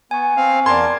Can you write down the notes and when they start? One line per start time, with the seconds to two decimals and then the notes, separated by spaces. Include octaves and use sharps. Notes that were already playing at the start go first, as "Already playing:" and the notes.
0.11 B3 G#5 C#6
0.37 C4 F5
0.66 E2 A#4 D5 A5 C6 G#6